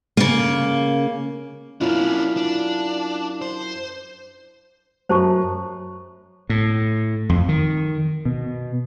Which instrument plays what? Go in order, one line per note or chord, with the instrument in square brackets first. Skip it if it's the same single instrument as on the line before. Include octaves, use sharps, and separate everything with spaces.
[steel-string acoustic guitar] C#3 A#3
[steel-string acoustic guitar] F#2 E4 F4 [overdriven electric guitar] C#4 D4
[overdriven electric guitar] D4
C5
[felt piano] F#2 [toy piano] C5 A5 C#6
[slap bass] A2
F2
D#3
B2